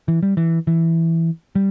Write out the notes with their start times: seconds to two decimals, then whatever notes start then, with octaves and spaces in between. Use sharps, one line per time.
0.08 E3
0.23 G3
0.37 E3
0.67 E3
1.55 G3